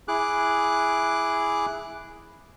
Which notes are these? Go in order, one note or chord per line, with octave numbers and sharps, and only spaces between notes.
E4 G#4 D6 F#6